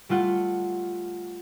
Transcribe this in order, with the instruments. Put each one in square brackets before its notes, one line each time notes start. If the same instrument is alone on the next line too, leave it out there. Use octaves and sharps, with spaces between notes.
[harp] G3 A3 F4 F#5